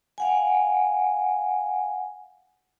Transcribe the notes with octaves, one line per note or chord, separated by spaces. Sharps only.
F5 F#5 G#5